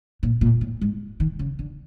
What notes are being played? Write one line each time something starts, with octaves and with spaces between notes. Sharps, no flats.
A#2
A#2
A2
G#2
D#3
C#3
D3